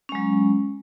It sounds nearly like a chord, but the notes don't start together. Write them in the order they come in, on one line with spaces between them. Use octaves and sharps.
C#4 G#3 F#3